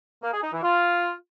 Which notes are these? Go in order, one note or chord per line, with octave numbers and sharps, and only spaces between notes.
A#3
G#4
D#4
E3
F4